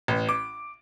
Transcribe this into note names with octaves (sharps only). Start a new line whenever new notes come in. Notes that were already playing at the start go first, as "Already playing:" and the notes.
A1
D6